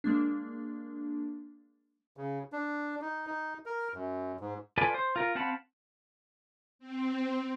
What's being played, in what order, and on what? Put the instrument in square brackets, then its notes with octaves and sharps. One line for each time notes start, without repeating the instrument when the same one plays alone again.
[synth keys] G#3 A#3 D4
[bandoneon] C#3
D4
D#4
D#4
A#4
F#2
G#2
[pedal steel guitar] F4 A4 B4 D5 G#5
C5
F4 A#4
C4 F5 F#5 A5 B5
[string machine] C4